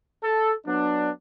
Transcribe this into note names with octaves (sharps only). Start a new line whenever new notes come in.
A4
F#3 B3 D4